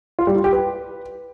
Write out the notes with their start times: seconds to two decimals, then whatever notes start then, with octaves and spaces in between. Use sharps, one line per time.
0.19 F4
0.27 G3
0.36 F4
0.44 G4
0.53 B4